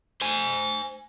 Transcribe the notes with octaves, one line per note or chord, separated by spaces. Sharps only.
C5 G#5